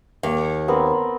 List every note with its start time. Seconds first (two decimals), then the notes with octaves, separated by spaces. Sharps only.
0.23 D#2
0.68 B3 C4 A#4